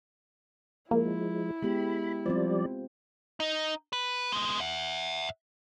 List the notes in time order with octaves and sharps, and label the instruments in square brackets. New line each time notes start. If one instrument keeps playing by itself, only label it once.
[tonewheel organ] F3 G#3 [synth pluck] A#3 [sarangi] E4
[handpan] G#3 B3 G4 [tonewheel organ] B5
[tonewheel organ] F3 G3 D5 [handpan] C4 F4 C5
[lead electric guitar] D#4
B4
G#3 B3
E5 F#5